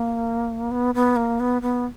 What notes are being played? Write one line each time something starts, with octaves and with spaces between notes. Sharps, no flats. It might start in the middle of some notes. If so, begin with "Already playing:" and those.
Already playing: A#3
B3
B3
A#3
B3
B3